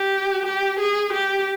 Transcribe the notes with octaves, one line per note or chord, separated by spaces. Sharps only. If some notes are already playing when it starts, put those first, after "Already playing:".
Already playing: G4
G4
G#4
G4